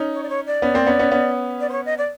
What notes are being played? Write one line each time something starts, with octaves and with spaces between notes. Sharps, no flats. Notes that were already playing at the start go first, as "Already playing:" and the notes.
Already playing: C#4 D#4
C#5
D5
C#5
D5
B3 C#4
A#3 C4
B3 C#4
B3 C#4
B3 C#4
D5
C5
C#5
D#5
D5